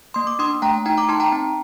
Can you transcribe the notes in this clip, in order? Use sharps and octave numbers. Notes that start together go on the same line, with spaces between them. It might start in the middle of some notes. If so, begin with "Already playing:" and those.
A#3 C6
D6
D4 C6 D#6
A3 G5 A#5
D#4 G5 A#5
A#5 D6
D#4 A5 C6
G5 A#5
C4